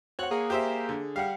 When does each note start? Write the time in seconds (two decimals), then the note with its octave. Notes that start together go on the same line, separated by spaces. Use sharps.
0.19 C4 F#4 C#5 F#5 F#6
0.31 A#3 G#4
0.50 G4 C5 E5
0.89 D3
1.16 G3 F5 F#5